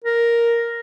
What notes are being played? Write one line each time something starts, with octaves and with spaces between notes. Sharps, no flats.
A#4